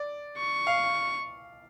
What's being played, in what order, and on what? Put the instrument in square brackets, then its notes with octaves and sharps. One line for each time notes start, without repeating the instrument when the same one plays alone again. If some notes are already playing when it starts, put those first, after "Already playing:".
Already playing: [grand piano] D5
[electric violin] C#6
[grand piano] F5